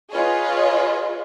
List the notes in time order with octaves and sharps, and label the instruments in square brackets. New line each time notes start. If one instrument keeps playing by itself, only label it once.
[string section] F4 G#4 B4 C#5 D#5